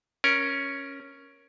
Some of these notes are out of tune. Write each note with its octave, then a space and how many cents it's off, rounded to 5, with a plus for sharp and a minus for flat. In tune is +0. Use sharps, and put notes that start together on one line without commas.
C#4 +0 A#4 +15